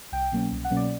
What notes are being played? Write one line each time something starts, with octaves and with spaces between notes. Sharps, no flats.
C2 G5
B2 F#3 A#3 C#4
C2
F#5
B2 F#3 A#3 C#4
D5